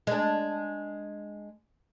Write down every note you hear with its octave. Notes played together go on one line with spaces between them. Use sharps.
G#3 D4